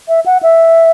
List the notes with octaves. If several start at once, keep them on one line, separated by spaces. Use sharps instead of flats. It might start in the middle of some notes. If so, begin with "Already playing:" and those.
E5
F#5
E5